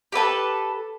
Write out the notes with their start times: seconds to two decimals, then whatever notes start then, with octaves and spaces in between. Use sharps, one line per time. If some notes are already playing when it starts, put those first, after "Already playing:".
0.12 G4 A4 B4 A5